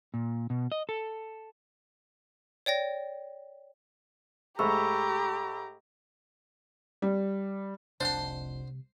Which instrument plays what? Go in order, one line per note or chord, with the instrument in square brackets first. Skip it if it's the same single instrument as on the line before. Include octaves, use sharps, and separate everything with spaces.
[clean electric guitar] A#2
B2
D#5
A4
[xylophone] C#5 D5 G5 A#6
[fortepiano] G#2 A3 [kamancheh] G4 A#5 [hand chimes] B5 C#6 E6
[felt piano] G3
[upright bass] F1 C2 [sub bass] C3 [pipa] D4 F#5 A5 [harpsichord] C5 C6